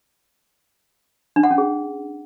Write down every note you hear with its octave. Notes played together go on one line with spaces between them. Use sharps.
D4
F#5
C#4
G#4